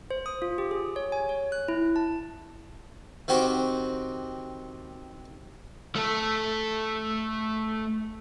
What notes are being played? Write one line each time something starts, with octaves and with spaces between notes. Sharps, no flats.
C5
D#6
F4
G4
G#4
C#5
G#5
C#5
F#6
E4
A5
D#3 C4 F#4 G4 C5
A3 A4